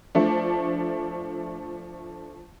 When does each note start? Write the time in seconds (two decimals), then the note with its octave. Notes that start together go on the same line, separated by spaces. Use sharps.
0.15 F3 A3 D4